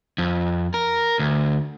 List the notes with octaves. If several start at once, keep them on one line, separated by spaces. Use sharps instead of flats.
F2
A#4
D2